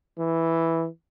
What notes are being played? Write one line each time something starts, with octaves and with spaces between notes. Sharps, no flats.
E3